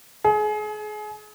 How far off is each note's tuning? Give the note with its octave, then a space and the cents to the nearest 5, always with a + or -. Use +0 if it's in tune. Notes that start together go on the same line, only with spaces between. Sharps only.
G#4 +30